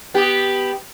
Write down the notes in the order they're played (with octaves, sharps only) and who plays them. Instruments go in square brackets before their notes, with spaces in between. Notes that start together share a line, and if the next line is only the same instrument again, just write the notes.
[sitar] B3 G4